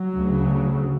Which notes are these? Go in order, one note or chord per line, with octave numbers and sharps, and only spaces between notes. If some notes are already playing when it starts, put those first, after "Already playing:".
Already playing: F#3
D2 C#3